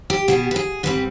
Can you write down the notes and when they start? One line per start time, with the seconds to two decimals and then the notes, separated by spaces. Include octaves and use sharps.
0.10 G4
0.28 B2 G3 B3 G#4
0.51 B4
0.56 G#4
0.83 G#2 G3 C4 B4